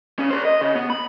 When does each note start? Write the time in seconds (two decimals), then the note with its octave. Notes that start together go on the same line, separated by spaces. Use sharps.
0.19 C#3 C#4
0.31 A#4 C5
0.45 D#5
0.61 C#3
0.75 B3
0.90 B5